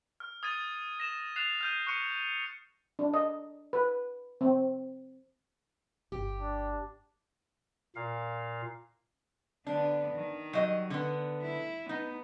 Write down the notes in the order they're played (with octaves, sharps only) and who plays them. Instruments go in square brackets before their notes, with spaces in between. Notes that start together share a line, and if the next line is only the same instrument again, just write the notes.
[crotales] F6
D#6 G#6 A6 D#7
A#6 E7
F#6 A6 C7 E7 F7
F6 G6 D#7
C#6 F#6 C#7 D#7
[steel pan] D4
D#5
B4
C4
[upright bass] G1 [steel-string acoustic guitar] G4
[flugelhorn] D4
[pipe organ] A#2 F5
[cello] D3 B3 [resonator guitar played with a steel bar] D4
[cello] D#3
[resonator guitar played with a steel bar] F#3 G3 D#5
D3 B3
[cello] E4
[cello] B3 [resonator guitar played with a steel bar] D#4